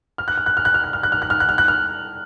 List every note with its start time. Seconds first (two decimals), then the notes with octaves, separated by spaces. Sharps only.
0.18 F6
0.28 F#6
0.38 F6
0.46 F#6
0.57 F6
0.65 F#6
0.74 F6
0.84 F#6
0.93 F6
1.03 F#6
1.12 F6
1.22 F#6
1.30 F6
1.40 F#6
1.49 F6
1.58 F#6
1.68 F6